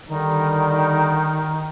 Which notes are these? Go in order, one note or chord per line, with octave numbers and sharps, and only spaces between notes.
D3 D#3 G3 D#4